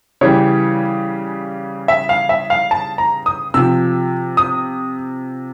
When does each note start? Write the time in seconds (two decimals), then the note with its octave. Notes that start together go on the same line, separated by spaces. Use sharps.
0.21 C#3 E3 G3 C#5
1.88 E5
2.09 F5
2.29 E5
2.50 F5
2.71 A5
2.98 A#5
3.26 D#6
3.54 C3 F3 E6
4.37 D#6